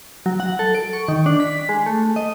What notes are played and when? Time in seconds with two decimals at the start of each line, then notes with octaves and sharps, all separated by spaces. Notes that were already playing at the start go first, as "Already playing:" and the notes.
0.26 F#3
0.40 F#5
0.59 A4
0.75 D7
0.93 C#6
1.08 D#3
1.26 D4
1.40 B6
1.69 G#3
1.86 A3
2.16 D#5